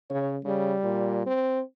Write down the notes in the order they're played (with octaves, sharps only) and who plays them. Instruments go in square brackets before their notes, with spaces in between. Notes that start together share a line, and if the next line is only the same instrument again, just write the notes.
[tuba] C#3 [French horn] C#5
[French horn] C#3 [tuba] G3
[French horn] A#2
C4